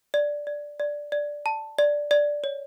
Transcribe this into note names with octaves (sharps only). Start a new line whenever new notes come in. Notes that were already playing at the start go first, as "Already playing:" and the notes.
D5
D5
D5
D5
A5
D5
D5
C#5